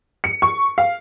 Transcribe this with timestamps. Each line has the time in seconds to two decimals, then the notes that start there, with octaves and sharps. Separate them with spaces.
0.24 C#7
0.42 C#6
0.78 F5